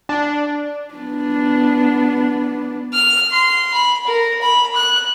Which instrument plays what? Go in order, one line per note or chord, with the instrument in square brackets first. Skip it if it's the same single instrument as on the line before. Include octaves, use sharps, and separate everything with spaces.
[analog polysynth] D4
[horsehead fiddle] B3 D4
[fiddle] F6
C6
B5
A#4
B5
F#6